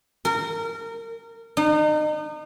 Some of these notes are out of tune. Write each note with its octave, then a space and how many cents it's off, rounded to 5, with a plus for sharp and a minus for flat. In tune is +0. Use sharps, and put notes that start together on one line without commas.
A#4 -25
D#4 -35